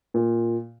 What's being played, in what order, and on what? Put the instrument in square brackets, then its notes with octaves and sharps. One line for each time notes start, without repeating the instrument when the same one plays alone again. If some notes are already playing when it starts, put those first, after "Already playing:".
[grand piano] A#2